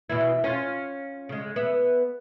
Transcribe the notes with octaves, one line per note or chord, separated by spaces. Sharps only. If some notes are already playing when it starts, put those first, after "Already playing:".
B2 E3 E4
C#4 F4
C#3 G#3
B3 E5